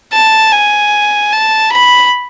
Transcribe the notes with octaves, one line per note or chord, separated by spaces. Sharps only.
A5
G#5
A5
B5